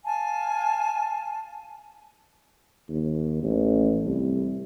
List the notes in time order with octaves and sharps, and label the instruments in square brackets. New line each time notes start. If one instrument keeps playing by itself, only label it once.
[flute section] F5 G#5 A5
[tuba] D#2
A1
C2